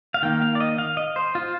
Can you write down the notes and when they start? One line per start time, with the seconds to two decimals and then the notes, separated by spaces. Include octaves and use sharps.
0.14 F5
0.23 D#3 A#3 G5
0.42 F5
0.55 D5
0.60 D#5
0.78 F5
0.97 D#5
1.16 C5
1.35 F4